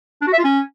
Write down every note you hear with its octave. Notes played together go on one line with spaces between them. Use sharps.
D4
F#4
E5
F4
C#4